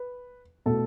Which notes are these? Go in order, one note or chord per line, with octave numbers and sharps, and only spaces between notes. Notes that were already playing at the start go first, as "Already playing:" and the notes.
Already playing: B4
B2 A3 A4